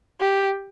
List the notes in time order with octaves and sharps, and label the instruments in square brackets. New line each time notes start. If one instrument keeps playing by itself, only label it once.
[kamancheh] G4